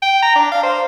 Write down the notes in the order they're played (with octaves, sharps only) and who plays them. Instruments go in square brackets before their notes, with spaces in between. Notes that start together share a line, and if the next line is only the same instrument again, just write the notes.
[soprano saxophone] G5
A#5
D4
F5
C5